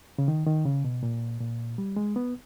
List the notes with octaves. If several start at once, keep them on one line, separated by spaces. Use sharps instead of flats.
C#3
D#3
D#3
C#3
B2
A#2
A#2
G3
G#3
B3